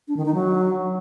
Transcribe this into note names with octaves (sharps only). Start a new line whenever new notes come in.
D4
D#3
D#4
F#3